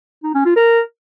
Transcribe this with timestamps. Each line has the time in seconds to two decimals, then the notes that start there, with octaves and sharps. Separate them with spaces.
0.24 D#4
0.34 C#4
0.45 F4
0.56 A#4